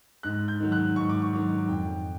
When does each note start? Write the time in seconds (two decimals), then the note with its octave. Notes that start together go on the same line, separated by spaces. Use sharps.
0.23 G#2 F#6
0.48 G6
0.60 D#3 F#3
0.72 F#6
0.96 G#2 C#6
1.10 D6
1.22 C#6
1.33 D#3 F#3
1.68 F2 G5